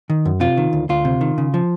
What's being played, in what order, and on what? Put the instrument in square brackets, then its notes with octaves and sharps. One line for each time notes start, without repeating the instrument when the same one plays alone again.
[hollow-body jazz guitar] D#3
F#2
C3 F4
D#3
D2
D2 F4
C3
D#3
C#3
F3